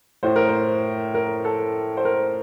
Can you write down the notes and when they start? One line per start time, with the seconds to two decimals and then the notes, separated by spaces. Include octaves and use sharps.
0.23 A2 C5
0.36 A#4
0.49 C5
1.14 A#4
1.45 A4
1.97 C5
2.05 A#4